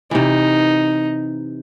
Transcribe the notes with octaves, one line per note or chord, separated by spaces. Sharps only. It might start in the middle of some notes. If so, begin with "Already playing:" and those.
C3 E3 D#4